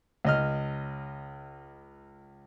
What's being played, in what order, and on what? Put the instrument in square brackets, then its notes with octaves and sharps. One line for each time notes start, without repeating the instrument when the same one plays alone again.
[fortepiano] C#2 D#5 F6